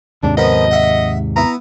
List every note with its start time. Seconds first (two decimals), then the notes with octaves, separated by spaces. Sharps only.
0.23 D#2 G#2 C3 D4
0.37 F3 B3 A#4 D#5
0.71 E5 F#5
1.36 B3 E4 A#5